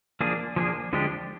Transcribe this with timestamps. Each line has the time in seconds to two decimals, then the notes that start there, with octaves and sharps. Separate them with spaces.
0.21 F3 A#3 D4 G#4
0.56 F3 A#3 D4 G#4
0.93 D3 F3 G#3 D4 G4